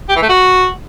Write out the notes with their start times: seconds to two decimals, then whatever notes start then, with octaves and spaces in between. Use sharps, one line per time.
0.09 G4
0.16 E3
0.23 A3
0.29 F#4